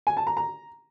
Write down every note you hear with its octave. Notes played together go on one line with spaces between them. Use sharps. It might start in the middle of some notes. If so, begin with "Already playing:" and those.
G#5
A5
A#5
A#5